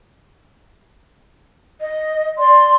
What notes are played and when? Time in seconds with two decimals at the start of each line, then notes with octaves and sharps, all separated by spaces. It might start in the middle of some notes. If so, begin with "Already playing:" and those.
1.81 D#5
2.38 D5 C6